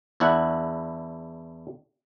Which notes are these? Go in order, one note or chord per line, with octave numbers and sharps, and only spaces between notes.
E2 D4 E4 F#5